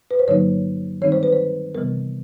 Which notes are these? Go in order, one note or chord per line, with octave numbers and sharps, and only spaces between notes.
B4
C5
G2 D3 F#3 A#3 D#4 C#5
D#3 G3 C4 D#4 C#5
C5
B4
C5
C3 E3 G3 B3 A#4